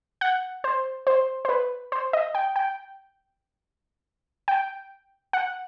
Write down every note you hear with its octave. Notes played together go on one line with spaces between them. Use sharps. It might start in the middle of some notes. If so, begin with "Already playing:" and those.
F#5
C5
C5
C5
B4
C5
D#5
G5
G5
G5
F#5